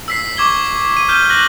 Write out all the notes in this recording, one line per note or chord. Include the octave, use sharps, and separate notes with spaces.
E6 B6 C7
C#6 D6 G#6 G7
D#7
F6 G6 D#7 G7
F#6 A#6 F#7